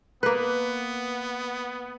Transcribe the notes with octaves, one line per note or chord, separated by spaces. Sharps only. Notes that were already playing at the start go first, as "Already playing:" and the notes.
A#3 B3 B4